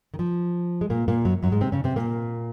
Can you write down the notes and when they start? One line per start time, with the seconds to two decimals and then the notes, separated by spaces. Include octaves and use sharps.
0.14 D#3
0.19 F3
0.81 G#3
0.90 A#2 A#3
1.08 A#2 A#3
1.25 F#2 F#3
1.43 F#2 F#3
1.52 G#2 G#3
1.61 C3 C4
1.72 C#3 C#4
1.84 C3 C4
1.96 A#2 A#3